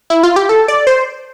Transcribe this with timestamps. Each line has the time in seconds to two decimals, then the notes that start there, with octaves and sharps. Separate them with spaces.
0.10 E4
0.23 F4
0.36 G4
0.49 A4
0.68 D5
0.87 C5